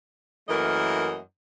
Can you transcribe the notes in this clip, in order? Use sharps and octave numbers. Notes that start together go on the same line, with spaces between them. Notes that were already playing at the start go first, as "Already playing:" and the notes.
F#2 E3 A3 A#3 A#4 D#5